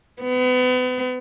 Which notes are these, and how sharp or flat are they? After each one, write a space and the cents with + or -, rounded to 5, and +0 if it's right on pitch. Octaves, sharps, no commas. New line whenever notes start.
B3 +35